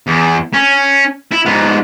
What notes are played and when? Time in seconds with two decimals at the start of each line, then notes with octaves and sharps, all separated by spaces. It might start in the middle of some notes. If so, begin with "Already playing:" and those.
0.07 E2
0.53 C#4
1.32 E4
1.46 G#2 B3